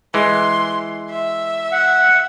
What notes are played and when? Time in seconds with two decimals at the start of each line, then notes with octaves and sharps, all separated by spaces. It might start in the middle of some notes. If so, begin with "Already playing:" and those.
0.14 E3 G#3 C6
1.10 E5
1.72 F#5